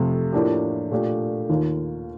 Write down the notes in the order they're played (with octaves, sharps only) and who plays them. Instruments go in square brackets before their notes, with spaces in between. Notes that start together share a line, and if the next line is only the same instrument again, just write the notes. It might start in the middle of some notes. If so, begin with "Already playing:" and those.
Already playing: [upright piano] F2 C3 F3 A3
A2 F3 A#3 D4 G4
A#2 A3 D4 G4
D#2 D#3 A#3 F4